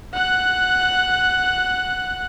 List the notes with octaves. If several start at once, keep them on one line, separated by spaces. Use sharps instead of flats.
F#5 F#6